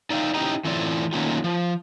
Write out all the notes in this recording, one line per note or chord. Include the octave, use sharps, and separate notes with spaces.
D#4 D5 E5 F5 G5
C#4 D#4 E4 G4 D#5 A#5
A2 E3 C4 E4 F4 D5
D#3 F#3 A3 A#3 C#4 F4
F3